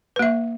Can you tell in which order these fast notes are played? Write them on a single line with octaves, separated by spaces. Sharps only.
B4 A#3 E5